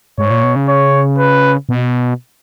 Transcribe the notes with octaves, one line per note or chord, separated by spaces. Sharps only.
G#2 C#5
A#2
B2
C#3
C#5
B4
B2